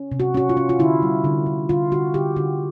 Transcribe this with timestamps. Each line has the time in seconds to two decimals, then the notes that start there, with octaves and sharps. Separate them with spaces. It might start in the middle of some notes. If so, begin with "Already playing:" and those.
Already playing: C#4
0.12 C3
0.20 F#4
0.34 C#4 F#4
0.49 F4
0.57 C#4
0.69 F4
0.79 D3 E4
1.02 G3
1.24 D3
1.46 D3
1.69 D3 F4
1.91 D3 F#4
2.14 D3 G4
2.36 D3 F#4